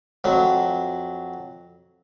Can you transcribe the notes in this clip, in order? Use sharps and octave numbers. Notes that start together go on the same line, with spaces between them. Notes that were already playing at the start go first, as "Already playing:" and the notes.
F2 F#3